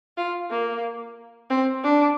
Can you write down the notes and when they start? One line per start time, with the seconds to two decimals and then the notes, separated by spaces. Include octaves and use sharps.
0.17 F4
0.50 A#3
1.50 C4
1.83 D4